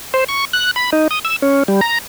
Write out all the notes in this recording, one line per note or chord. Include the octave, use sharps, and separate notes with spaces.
C5
C#6
F#6
B5
D#4
D#6
E6
C#4
G3
A#5